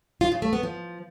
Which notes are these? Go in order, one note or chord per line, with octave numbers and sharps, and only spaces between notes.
F4
C#3
A3
B3
F3